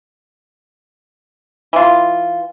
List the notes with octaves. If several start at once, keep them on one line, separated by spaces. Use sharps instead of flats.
E3 F4